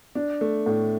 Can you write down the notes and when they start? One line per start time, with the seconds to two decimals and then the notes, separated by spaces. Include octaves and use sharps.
0.15 D4
0.41 A3
0.66 A2